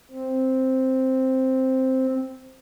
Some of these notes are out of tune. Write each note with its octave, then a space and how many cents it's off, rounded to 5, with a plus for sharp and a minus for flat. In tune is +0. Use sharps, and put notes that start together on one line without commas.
C4 +0